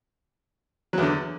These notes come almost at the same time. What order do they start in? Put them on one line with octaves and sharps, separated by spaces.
F#3 E2 D3